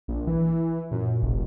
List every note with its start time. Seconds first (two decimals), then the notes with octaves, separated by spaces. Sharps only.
0.08 A#1
0.27 E3
0.91 F#2 A#2
1.22 F1 A#1